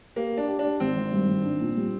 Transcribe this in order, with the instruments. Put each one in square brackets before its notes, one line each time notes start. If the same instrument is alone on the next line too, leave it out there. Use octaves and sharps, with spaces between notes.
[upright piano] A#3 [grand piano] G4
[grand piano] G4
[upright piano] D4
[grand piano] G4
[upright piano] D4
[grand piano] G4
[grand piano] G#1 [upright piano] C4
[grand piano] G#1
G2
G#1
D4
A#2
G3